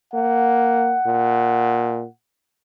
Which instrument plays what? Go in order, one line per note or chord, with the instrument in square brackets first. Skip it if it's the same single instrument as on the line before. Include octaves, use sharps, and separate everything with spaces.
[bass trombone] A#3 [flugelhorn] F#5
[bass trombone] A#2